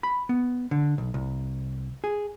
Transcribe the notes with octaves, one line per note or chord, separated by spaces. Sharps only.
B5
B3
D3
B1
C2
G#4